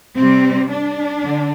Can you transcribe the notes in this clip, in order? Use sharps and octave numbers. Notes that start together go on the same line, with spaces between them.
C3 G3 C4
D4
D3